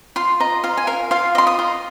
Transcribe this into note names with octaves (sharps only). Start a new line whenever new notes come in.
F4 C6
D#5 A#5
F4 F5
G#5
A#4 F5
F4 F5
D#5 C6
D#6
F4